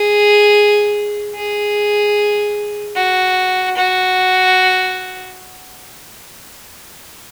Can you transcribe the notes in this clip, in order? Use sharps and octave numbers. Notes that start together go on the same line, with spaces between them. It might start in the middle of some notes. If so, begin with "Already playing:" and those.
Already playing: G#4
G#4
F#4
F#4